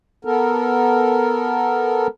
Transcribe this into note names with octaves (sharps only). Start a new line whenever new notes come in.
B3 A4 A#4